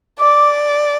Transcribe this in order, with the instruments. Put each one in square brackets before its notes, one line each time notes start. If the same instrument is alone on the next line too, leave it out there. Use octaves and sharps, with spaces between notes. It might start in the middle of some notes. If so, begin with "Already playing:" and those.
[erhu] D5 [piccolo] D6